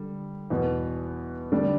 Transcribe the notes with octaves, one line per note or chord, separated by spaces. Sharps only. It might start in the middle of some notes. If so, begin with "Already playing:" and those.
Already playing: D3 G3
E2 B2 B3
D3 G3 D4